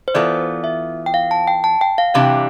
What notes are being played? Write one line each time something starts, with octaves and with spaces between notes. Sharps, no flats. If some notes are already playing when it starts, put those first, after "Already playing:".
C5
E3 B3 F4 A4 D5
E5
G5
F5
A5
G5
A5
G5
F5
C3 E3 G3 D4 G4 F5